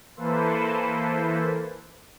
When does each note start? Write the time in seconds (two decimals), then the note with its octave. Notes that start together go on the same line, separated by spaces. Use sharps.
0.16 E3 A#3 E4 A4 B4 C5